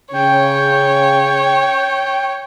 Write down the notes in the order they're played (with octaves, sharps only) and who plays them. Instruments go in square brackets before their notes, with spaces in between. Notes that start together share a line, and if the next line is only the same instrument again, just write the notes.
[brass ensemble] C#3 [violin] C#5 [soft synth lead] G5